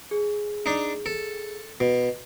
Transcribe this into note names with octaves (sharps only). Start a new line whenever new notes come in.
G#4
D4 D#4
A4
B2